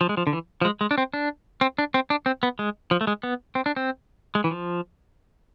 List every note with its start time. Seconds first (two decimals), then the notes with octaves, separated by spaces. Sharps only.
0.01 F3
0.09 G#3
0.17 F3
0.27 D3
0.33 E3
0.61 F3
0.65 G#3
0.81 G#3
0.91 D4
0.98 C4
1.14 D4
1.61 C4
1.78 D4
1.94 C4
2.10 D4
2.26 C4
2.43 B3
2.59 G#3
2.91 F3
3.01 A3
3.07 G#3
3.23 B3
3.55 C4
3.66 D4
3.76 C4
4.35 G#3
4.44 E3
4.51 F3